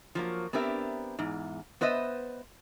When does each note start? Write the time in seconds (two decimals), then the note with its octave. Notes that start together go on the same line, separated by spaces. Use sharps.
0.15 F3 F#3 A#3
0.53 B3 C4 D4 G4 A#4 E5
1.19 E2 G#2
1.81 B3 B4 C5 D#5 E5